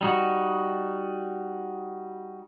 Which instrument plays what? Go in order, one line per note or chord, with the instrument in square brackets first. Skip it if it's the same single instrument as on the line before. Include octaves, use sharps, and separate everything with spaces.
[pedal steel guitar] G3 D#4 F#4